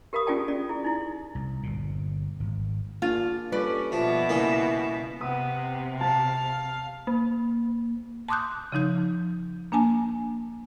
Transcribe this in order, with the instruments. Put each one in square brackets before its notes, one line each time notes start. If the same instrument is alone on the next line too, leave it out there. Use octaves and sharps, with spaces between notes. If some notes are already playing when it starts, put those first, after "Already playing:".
[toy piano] G4 A#4 F5 B5 D#6
C#4 F4 G#4 D5 G5 A5
C#4 D5
E4 G#4
D#4 E4
[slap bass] C2
G1 A#2
G#1
[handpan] A#3 D4 G#4 [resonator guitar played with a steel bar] F4
[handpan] G3 F4 A4 [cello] C#4 [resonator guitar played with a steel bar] B4 D5
[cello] B2 E5 [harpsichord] F3
[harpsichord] C#3 E3 A#3
[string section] C3 [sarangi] B3 [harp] D#6
[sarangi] F5 [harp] A5
[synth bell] A#3
[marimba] A5 C6 D6 D#6 F#6 G6
C#3 F3 D#4 G6
A#3 D4 G#5 A5